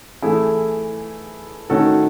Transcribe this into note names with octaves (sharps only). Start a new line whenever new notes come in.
E3 A3 E4 G#4
D#3 A3 C#4 F#4 A4